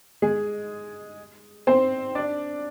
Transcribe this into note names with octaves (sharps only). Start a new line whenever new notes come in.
G#3 G#4
C4 C5
D4 D5